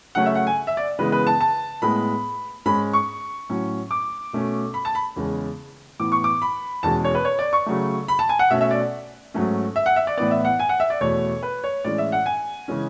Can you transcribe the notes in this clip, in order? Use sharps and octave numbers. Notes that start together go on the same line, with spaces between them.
C#3 F#3 A3 C#4 F#5
E5
F#5
G#5
E5
D5
C#3 E3 G#3 B3 B4
B4
A5
A5
A2 G#3 B3 B5
G#2 G#3 C#4 B5
C#6
A2 F#3 C#4
D6
B2 A3 C#4
B5
A5
B5
E2 C#3 G#3 C#4
A2 E3 B3 D6
C#6
D6
B5
E2 B2 G#3 C#4 A5
C#5
B4
C#5
D5
C#6
C#3 F#3 A3
B5
A5
G#5
F#5
B2 A3 C#4 E5
E5
D5
G#2 F#3 A3 C#4
E5
F#5
E5
D5
A2 E3 B3 D5
E5
F#5
G#5
F#5
E5
D5
E2 B2 A3 C#5
B4
C#5
A2 E3 G#3 C#4 D5
E5
F#5
G#5
C#3 E3 G#3 C#4